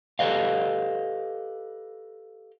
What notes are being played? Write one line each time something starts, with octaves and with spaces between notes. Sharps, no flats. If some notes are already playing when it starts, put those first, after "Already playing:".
G4 A4 B4 D#5 F5